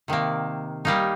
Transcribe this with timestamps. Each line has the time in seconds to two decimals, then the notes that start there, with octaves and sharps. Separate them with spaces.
0.08 C3 D#3 A#3
0.85 G3 A#3 D#4